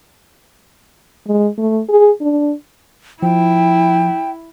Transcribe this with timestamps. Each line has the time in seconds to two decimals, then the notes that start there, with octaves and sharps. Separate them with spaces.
1.27 G#3
1.58 A3
1.89 G#4
2.21 D4
3.23 F3 E4 G5